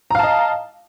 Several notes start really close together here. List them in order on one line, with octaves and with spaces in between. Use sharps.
A#5 F5 A5 D#5